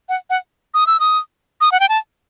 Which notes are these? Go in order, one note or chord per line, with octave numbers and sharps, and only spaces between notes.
F#5
F#5
D#6
E6
D#6
D#6
F#5
G5
A5